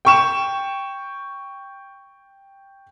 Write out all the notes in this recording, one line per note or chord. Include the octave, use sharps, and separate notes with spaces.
G5 C#6 E7